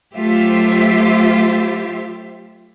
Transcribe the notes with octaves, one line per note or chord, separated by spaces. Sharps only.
F#3 A3 F4 G4 C5 E5